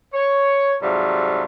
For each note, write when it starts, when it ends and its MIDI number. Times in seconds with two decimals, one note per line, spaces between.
0.14 0.75 73
0.82 1.44 44
0.82 1.44 48
0.82 1.44 54
0.82 1.44 55
0.82 1.44 65
0.82 1.44 69